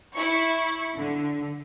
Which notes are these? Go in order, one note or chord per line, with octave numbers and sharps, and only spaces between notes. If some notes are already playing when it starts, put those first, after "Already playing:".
E4 C#6
D3